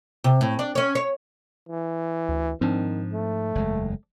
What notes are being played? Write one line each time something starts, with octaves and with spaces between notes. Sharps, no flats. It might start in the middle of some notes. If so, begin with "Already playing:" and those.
C3
A2
D4
C#4 C#5
C#5
E3
D2
G#2 D#3 F3 C4 D4
A3
F#1 E2 G#3